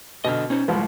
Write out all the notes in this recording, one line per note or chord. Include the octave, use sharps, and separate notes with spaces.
B2 D3 D#5 F6
C#4 D#4 C5
C2 A2 F3 G#3 B4